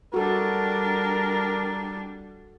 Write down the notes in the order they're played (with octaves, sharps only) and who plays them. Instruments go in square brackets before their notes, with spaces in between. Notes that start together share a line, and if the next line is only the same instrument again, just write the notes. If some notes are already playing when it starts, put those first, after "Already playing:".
[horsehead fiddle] G3 D4 [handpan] F#4 A4 [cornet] A#4